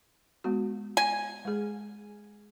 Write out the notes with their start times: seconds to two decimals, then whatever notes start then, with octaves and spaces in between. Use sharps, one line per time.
0.44 G#3 B3 F#4
0.97 G#5
1.45 G#3 G#4